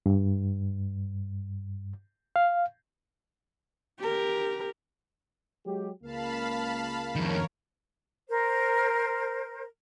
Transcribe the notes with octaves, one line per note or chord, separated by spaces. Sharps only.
G2
F5
G4 A#4
F#3 G#3 G4
C#2 A#3 F5 A5 B5
F2 D#3 A#4 C#5
A#4 C5